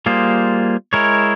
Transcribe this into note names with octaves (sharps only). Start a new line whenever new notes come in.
G3 A#3 F4 G#4 C5
G#3 E4 A#4 C#5